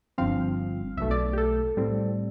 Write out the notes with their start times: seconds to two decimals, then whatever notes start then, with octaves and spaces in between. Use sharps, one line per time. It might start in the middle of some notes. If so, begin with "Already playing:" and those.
0.18 G1 G2 F3 C4 F5
0.97 B1 B2 A3 E5
1.11 D5
1.33 G4
1.38 A4
1.77 A2 G3 C4